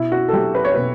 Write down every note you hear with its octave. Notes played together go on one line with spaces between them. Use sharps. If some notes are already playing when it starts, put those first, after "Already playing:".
Already playing: B2 E4
F#4
A4
F#3 G4
B4
C#5
B2 B4